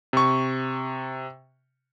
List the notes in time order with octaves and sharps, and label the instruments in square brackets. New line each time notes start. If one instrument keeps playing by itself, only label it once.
[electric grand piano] C3 C#6